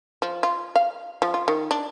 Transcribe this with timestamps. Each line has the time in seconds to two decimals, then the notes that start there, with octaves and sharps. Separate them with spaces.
0.22 F3
0.43 F4
0.76 F5
1.22 F3
1.34 F4
1.48 D#3
1.71 D4